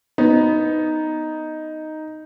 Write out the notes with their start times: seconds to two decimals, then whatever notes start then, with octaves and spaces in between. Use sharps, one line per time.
0.18 B3 D#4